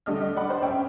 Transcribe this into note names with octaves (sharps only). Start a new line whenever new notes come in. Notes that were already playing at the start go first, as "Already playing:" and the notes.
D3 G3 A3 D#5 F6
D#5
D5 F#5 B5
C5
C#4 D4 E5 G5